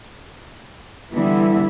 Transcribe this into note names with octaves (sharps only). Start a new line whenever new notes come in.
D3 E3 G3 B3 E4